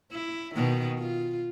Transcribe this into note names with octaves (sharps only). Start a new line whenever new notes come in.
E4
B2 D#3
F4